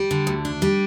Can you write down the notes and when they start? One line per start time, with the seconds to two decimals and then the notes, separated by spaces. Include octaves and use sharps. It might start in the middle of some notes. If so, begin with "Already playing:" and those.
Already playing: G3
0.11 D3
0.27 D2
0.45 D4
0.62 G3